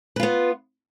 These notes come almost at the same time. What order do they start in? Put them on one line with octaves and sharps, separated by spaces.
B4 F4 B3